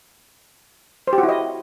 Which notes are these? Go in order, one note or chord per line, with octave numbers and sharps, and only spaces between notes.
C5
G4
F#4
E4
D#5